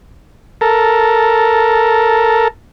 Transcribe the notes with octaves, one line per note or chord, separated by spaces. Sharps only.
A4 A#4